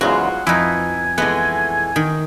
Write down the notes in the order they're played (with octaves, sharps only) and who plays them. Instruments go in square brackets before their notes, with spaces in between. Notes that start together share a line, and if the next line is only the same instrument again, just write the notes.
[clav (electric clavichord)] E2 G#2 C#3 [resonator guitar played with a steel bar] F#3 F4 [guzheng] F#4
[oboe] F#5
[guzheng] F2 B4 [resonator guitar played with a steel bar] F3 [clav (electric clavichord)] D#4 E4 [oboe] G#5
[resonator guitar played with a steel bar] E3 G#3 A3 [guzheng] B3 [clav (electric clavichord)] F#5
[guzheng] D#3